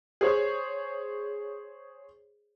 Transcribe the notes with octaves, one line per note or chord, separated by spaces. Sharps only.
G#4 C5 C#5